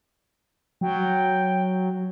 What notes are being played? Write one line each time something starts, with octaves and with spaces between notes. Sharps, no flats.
F#3 G5